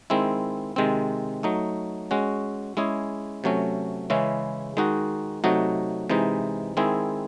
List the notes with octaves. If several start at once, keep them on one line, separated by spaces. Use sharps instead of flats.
D#3 G#3 C4 E4
C3 D#3 G#3 C4
F#3 A3 D#4
G#3 C#4 F#4
G#3 C#4 E4 G#4
C3 F#3 A3 C#4
C#3 E3 G#3 C#4 E4
D#3 G#3 D#4 F#4
C3 F#3 A3 D#4 F#4
C3 E3 G#3 D#4
D#3 G#3 C4 E4 G#4